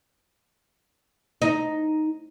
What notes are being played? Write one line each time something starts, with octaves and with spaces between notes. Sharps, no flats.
D#4